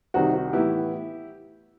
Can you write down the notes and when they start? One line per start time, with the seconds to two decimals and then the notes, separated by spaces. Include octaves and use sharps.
0.14 C2 C3 D#3 D#4 F#4
0.34 D#4 F#4
0.53 A2 E3 B3 E4 G4